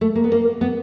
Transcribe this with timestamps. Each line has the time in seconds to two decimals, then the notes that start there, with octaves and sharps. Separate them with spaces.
0.01 A3
0.15 A#3
0.24 B3
0.32 A#3
0.61 B3